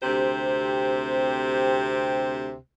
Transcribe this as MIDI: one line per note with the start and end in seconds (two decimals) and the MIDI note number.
0.02 2.55 38
0.02 2.55 48
0.02 2.55 60
0.02 2.55 67
0.02 2.55 72